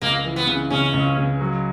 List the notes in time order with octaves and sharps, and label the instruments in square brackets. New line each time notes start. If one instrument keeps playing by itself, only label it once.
[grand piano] C#2 [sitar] A#3
[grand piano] E3
[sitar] B3
[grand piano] C#3
[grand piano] C#3 [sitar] C#4
[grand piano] C#2
C#3
F#3